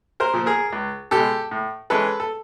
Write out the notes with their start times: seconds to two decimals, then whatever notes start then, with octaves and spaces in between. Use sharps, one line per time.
0.20 A#4 C5
0.34 A#2 F3
0.46 G#4 A#4
0.73 C#2
1.11 B2 G#3 G4 A4
1.51 A2
1.90 E3 G#3 C#4 A4 B4
2.20 A4